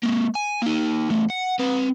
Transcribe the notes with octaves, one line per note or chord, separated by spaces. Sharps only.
G#3 A#3
G#5
A#3 D#4
E2 A3
F#5
C4 B4